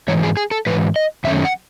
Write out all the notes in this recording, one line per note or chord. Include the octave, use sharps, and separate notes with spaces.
G#2 E3 C#5
G#4
G#4
A4
G#2 E3 B4
D#5
F#2 D#3 A3 C#4 E5
F#5